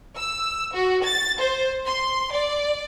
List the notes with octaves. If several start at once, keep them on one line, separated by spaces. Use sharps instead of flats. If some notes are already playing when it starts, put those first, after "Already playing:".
E6
F#4
A6
C5
C6
D5